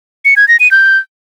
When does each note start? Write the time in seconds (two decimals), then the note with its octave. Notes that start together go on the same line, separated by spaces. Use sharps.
0.25 C#7
0.37 G#6
0.48 A#6
0.60 D#7
0.71 G6